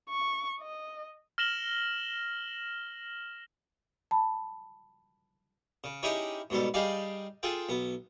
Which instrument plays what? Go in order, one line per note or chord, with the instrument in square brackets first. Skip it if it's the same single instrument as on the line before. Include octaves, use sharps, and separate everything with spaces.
[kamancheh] C#6
D#5
[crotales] F6 A#6 E7 F#7 G7
[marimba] A5 B5
[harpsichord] C#3
C#4 D#4 E4 G4 G#4 C#5
G#2 B2 G3 A4
G3 D#4 G4 G#4 D5 F5
F4 G#4 A4 G5
B1 B3